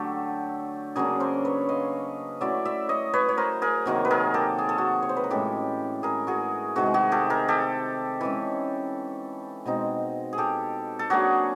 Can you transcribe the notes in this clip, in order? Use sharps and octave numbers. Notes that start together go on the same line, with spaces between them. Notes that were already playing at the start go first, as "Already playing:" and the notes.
Already playing: D3 F#3 A3 G4 A4
C#3 F#3 A#3 D4 G#4 A#4
A#4 C5
B4 C#5
D#5 F5
F#3 A3 C#4 E4 D5 E5
D5 E5
C#5 D#5
B4 C#5
C#5
A#4 C5
G#4 A#4
C3 D#3 F#3 A#3
B4
G#4 A#4
G4 A4
G#4
A4
F#4 G#4
C#5
C5
B4
A#4
A2 E3 G#3 C#4 G4 A4
G#4 A#4
F#4 G#4
C3 D#3 G#3 F#4 G#4
F#4 G#4
G4 A4
G#4 A#4
G4 A4
E3 G#3 C#4
B2 G#3 C4 D#4
G#4
G4 A4
A4
F#3 A#3 D4 F#4 G#4